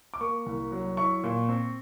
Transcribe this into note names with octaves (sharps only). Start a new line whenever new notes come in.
D6
A#3 C#6
C2
F#3
E4 C#6
A#2
C4